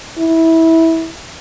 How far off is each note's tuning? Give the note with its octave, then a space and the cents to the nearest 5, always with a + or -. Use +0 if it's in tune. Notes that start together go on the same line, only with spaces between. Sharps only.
E4 -15